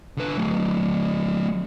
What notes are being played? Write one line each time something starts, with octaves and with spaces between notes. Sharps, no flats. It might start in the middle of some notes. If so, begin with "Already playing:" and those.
D3 B4
F#3 A3